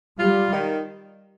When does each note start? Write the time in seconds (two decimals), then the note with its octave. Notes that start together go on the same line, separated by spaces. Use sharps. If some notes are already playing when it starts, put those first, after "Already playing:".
0.20 G3 F4
0.52 D#3